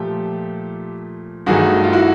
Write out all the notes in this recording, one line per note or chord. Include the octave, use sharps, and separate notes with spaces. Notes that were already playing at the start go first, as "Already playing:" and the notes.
Already playing: A#2 F3 A3 G4 A4
G2 D#3 F#3 A3 F#4 G#4
F4
E4 F#4